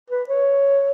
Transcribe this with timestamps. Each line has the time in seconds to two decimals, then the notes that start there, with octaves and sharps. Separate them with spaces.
0.10 B4
0.29 C#5